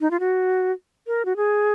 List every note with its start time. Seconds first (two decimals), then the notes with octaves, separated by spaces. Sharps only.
0.01 D#4
0.11 F4
0.20 F#4
1.07 A#4
1.25 F#4
1.36 G#4